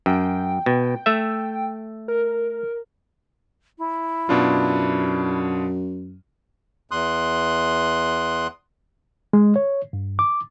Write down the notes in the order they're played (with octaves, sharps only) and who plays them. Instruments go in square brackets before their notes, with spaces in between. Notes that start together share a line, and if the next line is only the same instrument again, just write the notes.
[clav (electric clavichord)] F#2 [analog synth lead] G5
[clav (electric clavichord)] B2
A3 E5
[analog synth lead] A#4
[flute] E4
[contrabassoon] F#2 [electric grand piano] B2 D4 F4
[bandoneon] E2 C6 D#6 F#6
[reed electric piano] G#3
C#5
G2
D6